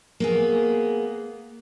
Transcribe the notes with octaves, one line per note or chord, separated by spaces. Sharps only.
A#3 B3 G#4